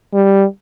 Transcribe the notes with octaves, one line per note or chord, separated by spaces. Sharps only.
G3